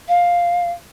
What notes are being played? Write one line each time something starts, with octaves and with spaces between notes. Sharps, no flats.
F5